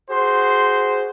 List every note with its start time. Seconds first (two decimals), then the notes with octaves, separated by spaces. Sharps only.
0.11 F#4 G#4 C5 C6